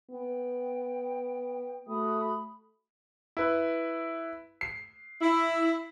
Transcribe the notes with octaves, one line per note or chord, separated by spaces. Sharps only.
B3 G5
A3 F#4 B5 D#6
E4 B4
C7
E4